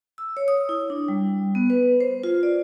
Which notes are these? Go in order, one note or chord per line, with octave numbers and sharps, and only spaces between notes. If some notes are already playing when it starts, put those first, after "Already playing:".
E6
C#5
D#6
E4
D4
G3
B3
B4
C5
F4
D5